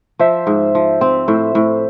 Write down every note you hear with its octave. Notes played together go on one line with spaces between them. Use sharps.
F3 C5 E5
G#2
F3
C4
A2 C5 E5
A2